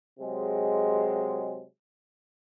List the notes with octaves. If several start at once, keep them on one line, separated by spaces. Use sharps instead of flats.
C3 F#3 G#3